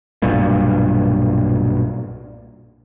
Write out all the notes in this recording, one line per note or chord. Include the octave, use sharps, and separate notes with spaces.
B1 G2 A#2